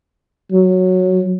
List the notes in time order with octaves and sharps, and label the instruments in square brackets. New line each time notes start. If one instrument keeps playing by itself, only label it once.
[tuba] F#3